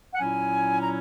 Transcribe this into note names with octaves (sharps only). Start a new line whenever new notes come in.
F#5
A#2 F#3 C#4 E4 G#5
A#5